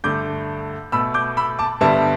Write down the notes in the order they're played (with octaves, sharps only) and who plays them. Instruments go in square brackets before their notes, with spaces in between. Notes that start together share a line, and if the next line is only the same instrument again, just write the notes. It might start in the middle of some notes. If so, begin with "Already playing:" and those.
[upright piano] G2 D3 A3 D6 G6
B2 A3 B5 E6
D6 G6
B5 E6
A5 D6
G2 D3 G3 B3 E5 A5